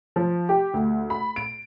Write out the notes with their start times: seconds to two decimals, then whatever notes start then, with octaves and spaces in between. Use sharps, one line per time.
0.16 F3
0.49 G4
0.74 D2
1.10 B5
1.36 D7